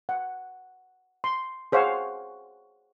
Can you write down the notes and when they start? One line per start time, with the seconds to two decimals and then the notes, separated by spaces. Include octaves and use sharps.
0.09 F#5
1.24 C6
1.72 G#4 C5 C#5 F5 F#5